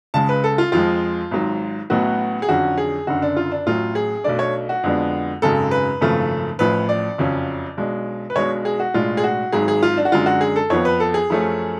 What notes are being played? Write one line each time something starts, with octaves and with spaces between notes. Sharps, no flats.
C#2 C#3 G#3 A5
B4
A4
F4
F2 F3 G#3 F4
G#1 G#2 F#3
A1 A2 F#3 B3 F#4
G#4
F2 D3 F#3 C#4 F#4
G#4
F#1 F#2 D3 F#4
D4
F4
D4
A1 A2 F#3 F4
G#4
B1 B2 A3 D4 D5
C#5
F#4
F2 D3 G#3 B3 D4
G#1 F#2 C#3 G#3 A4
B4
G#1 F#2 C#3 F3 A3
A1 A2 F3 B4
D5
F#1 F2 C#3 F#3 C#4
B1 B2 G#3 D4
B4
B1 B2 G#3 D4 C#5
G#4
F#4
B1 A2 G#3 D4 F4
G#4
F#4
G#1 G#2 F#3 G#4
G#4
F4
D4
F#4
F#2 D3 G#3 D4 F4
F#4
G#4
A4
F2 F3 B3 C#5
B4
A4
G#4
F#2 F3 A3 C#4